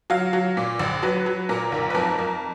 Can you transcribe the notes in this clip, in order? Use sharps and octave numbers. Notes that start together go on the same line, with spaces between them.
F#3 F5
F#3
A#2
A#1
F#3 B4
F#3
A#2 A#4
B1
B4
F2 A#4
F2